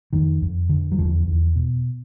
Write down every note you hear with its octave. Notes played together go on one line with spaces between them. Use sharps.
F2 D#3
F2
D3
F#3
E2 F3
E2
B2